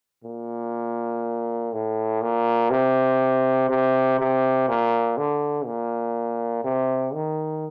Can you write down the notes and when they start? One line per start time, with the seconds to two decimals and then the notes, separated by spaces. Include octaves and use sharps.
0.24 A#2
1.73 A2
2.22 A#2
2.71 C3
3.69 C3
4.19 C3
4.68 A#2
5.18 D3
5.66 A#2
6.64 C3
7.14 D#3